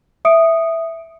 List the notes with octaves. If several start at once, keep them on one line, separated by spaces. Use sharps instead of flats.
E5 D#6 C#7 D7